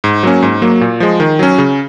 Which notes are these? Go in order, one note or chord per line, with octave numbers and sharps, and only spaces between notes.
G#2
F#3 A#3 C#4
G#2
F#3 A#3
A#2
F3 G#3
D#3
F#3 C#4
C#3